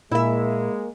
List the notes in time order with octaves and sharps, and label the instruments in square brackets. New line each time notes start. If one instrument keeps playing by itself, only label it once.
[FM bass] A#2 [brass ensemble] G#3 [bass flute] A#3 [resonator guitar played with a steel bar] E4 E5